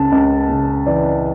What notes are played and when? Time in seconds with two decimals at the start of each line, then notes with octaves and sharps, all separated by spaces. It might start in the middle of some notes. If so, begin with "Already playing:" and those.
Already playing: C#2 C#3 A5
0.12 C#2
0.49 C#3
0.87 E3 D5